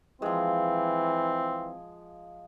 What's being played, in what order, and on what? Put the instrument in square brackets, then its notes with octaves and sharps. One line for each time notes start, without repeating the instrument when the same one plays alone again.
[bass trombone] E3 [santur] F3 G#3 [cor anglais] C4